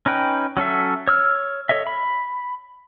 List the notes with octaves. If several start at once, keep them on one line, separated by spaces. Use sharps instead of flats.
C#4 D#4 B4 G5
F#3 C#4 A4 E5
C#5 E6 F6
A4 C#5 D#5 E5
B5